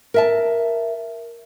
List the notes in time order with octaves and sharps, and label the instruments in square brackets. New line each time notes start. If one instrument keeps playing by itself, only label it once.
[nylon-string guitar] A#4 E5 A5